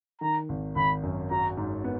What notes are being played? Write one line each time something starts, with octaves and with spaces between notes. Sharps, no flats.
D#3 A#5
G#1
G#1 B5
F#2
F#4 A#5
G#2
B3